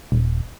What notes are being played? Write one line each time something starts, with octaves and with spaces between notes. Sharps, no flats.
D#1